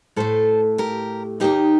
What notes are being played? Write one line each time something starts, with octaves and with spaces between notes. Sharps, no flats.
A2 A3 A4 C5
G4 A#4
D#2 D#3 A#3 D#4 G4